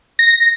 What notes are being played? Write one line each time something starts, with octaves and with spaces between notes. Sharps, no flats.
A#6